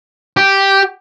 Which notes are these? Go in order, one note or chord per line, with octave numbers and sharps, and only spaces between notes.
G4